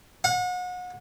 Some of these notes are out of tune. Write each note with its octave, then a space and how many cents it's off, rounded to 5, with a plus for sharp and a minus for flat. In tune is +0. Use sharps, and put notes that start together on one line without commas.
F#5 -35